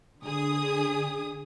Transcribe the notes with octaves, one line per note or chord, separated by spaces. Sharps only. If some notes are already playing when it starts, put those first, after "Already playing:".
D3 G#4 D#6